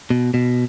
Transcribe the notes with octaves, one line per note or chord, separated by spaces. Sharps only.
B2
B2